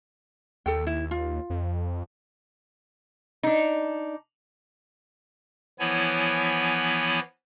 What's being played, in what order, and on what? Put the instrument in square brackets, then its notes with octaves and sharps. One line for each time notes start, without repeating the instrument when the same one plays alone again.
[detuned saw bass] D#2 [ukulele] A4 G5
[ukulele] E4
F4
[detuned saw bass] F2
[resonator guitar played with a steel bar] D4 D#4
[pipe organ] E3 F3 B3 E4 C#5 G#5